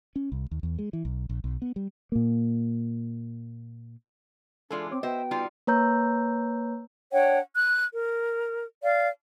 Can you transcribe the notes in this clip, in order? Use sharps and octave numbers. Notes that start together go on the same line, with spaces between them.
C#4
C2
D#2
E2
G#3
E3
B1
A#1
B1
B3
G3
A#2 A#3
E3 G#3 D4 F4 A4 D5
C4 C#5 D6
B3 F#4 B4 C5 D#5 E5 G5
G3 D#4 F4
A#3 B4 C#5 A#5 E6 G6
D4 C#5 F#5 G5
F#6
A#4
D5 F5